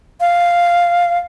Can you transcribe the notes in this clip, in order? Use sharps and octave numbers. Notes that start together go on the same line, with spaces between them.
F5